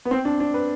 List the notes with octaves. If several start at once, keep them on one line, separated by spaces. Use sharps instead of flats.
B3
C4
D4
D4
B4